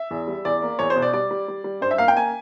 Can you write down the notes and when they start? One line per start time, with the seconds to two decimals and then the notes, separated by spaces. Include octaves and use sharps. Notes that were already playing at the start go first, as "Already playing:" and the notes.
Already playing: E5
0.11 E2
0.28 G3
0.45 E2 D5
0.62 A#3
0.79 E2 C#5
0.90 C5
0.96 B2
1.02 D5
1.13 G3 D5
1.31 G3
1.48 G3
1.64 G3
1.81 G2 C5
1.91 E5
1.98 A#3 F5
2.08 G5
2.15 A#3 G#5